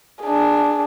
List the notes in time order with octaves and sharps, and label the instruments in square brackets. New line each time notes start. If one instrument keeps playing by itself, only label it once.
[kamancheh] D4 G#4